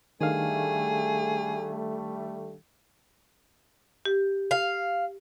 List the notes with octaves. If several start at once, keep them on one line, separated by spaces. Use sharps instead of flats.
D#3 G3 A3 D4 G#4 F5
G4
F5